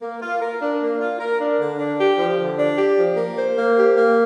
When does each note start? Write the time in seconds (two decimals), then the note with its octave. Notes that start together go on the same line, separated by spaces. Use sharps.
0.01 A#3
0.21 F4
0.41 A#4
0.61 D4
0.80 A#3
1.00 F4
1.19 A#4
1.40 D4
1.59 D3
1.78 D4
1.99 G4
2.18 F3
2.38 D3
2.57 D4
2.77 G4
2.97 F3
3.17 A#3
3.37 C5
3.56 A#3
3.77 G4
3.96 A#3